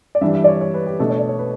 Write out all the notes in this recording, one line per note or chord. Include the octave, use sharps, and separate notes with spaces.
D5
G2 E3 G3 D4 E5
E5
D5
C#5
C#5
B4
G4
B2 A3 D4 A4
C#5
D5
C#5
B4